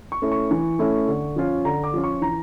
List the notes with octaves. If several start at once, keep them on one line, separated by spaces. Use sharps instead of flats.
C#6
A3 C#4 E4
C#6
E3
A3 C#4 E4
D3
F3 C#4 F4
D3 A#5
D6
F3 C#4 F4
C#6
E3 A#5